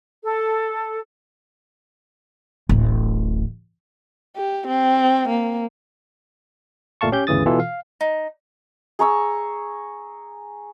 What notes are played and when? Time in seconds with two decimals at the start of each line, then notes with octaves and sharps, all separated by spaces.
0.23 A4
2.69 D1 A1
4.36 G4
4.67 C4
5.28 A#3
7.01 G1 A#2 A3 F5 A5 C#6
7.12 C#4 G4 G6
7.27 G1 D2 C#3 E3 D#6 A6
7.46 B2 E3 F4 A4
7.60 F5
8.01 D#4
8.99 G#4 A#5 C#6 E6